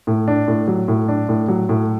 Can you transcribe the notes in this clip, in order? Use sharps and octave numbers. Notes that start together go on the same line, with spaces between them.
A2
D4
A2
F#3
A2
D4
A2
F#3
A2